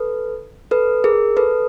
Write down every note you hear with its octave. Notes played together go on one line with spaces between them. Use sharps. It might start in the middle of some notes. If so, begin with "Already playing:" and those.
Already playing: A4 B4
A4 B4
G#4 A#4
A4 B4